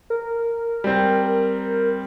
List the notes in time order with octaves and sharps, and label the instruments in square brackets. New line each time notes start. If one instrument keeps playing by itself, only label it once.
[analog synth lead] A#4
[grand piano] G3 C4